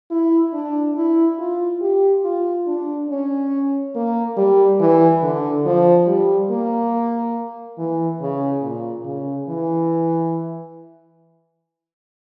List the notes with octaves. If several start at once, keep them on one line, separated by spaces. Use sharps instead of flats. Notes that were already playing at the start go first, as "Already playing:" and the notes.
E4
D4
E4
F4
G4
F4
D4
C#4
A#3
G3
E3
D3
F3
G3
A#3
E3
C#3
A#2
C#3
E3